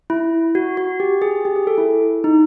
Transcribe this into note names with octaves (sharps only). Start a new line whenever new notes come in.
E4
F#4
F#4
G4
G#4
G4
G#4
A4
E4
D#4